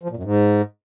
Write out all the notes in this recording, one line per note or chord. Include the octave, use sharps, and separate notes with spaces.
F3
A#2
F#2
G#2